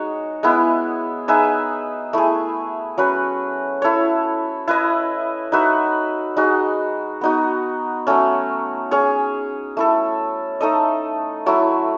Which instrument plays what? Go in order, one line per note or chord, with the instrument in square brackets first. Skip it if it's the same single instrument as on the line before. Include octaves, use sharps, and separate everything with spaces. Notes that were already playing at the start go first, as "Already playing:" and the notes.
Already playing: [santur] G#3 D#4 F#4 C#5
G#3 B3 E4
D#4 G#4 B4 E5
A3 E4 G#4
F#3 C#4 F#4 B4
E4 A4 C#5
E4 B4 D#5
D#4 F#4 B4 E5
G#3 D#4 F#4
B3 D#4 F#4
F#3 A3 C#4
C#4 G#4 C#5
A3 E4 A4
A3 D#4 A4 D#5
F#3 A3 E4